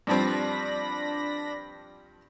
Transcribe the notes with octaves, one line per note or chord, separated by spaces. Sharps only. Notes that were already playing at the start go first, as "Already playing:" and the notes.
G2 F3 C4 D4 B5 A#6